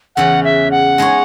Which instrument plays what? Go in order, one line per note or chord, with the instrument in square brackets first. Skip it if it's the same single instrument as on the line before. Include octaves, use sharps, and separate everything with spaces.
[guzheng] E2 C#3 E3 [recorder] F#5
[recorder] E5
F#5
[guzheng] G#3 D#4 G#4 C#5